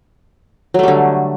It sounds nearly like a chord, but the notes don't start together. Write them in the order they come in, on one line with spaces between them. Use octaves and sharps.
F#3 A3 G3 D3